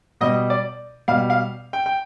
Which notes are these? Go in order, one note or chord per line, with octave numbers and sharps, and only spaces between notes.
B2 G3 D#5
D5
B2 G3 F5
F5
G5
G5